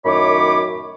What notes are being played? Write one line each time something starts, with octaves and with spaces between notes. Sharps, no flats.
F#2 A2 D#3 C#5 B5 D6